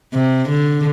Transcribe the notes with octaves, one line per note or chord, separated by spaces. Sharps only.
C3
D3